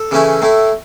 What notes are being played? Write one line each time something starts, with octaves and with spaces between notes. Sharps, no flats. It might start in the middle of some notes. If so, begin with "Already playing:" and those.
Already playing: A4
C#3 E3 A3 C#4 E4
A2 A3 E4